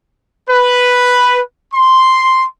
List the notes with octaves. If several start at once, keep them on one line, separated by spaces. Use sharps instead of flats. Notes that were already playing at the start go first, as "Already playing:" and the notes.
B4
C6